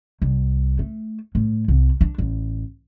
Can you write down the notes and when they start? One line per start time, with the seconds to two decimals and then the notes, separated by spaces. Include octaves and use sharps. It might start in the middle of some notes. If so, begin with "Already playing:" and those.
0.22 C2
0.79 A3
1.35 A2
1.68 C2
2.01 D4
2.18 A1